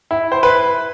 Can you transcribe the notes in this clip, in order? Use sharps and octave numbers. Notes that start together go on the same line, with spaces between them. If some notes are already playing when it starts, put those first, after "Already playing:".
E4
C5
B4